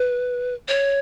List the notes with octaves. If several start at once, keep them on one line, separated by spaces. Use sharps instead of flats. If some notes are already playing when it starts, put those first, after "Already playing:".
Already playing: B4
C#5